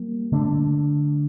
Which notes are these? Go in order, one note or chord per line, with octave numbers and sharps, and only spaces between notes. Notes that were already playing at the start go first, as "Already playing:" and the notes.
Already playing: G3 A#3
D3 A3 D4